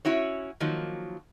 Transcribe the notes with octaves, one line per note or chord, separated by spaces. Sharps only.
C#4 E4 F#4 C#5
D#3 F3 F#3 A#3